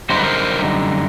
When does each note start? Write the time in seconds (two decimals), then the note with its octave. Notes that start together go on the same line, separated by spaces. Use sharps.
0.09 F#2 D3 G3 D#4 C5
0.18 B4
0.24 A#4 C5